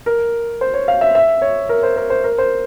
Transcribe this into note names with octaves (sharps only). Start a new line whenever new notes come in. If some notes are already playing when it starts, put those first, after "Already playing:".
A#4
C5
C#5
F5
E5
E5
C#5
A#4
C5
A#4
C5
A#4
C5